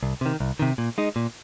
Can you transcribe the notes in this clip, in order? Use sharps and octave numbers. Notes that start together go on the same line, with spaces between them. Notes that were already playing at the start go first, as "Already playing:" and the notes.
C2
C3 D#3
C2
C3 D#3
A#2
G#3 D#4
A#2